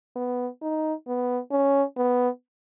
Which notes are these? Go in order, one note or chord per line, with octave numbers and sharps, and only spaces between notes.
B3
D#4
B3
C#4
B3